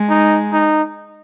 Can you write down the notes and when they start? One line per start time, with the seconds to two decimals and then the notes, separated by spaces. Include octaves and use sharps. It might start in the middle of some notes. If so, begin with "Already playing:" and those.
Already playing: G#3
0.09 D#4
0.52 D#4